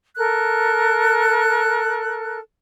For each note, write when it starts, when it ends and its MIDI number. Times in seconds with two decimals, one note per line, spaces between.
0.16 2.39 69
0.16 2.39 70
0.16 2.39 90